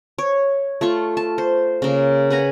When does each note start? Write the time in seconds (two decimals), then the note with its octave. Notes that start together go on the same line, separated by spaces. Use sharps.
0.18 C#5
0.81 A3 F4 C#6
1.17 A5
1.38 C5
1.82 C#3 A#3
2.30 B4 F#5 G#5 A#5